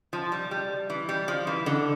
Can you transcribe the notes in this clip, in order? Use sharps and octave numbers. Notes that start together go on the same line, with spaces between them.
F3
G3
G3
E3
G3
F3
E3
D3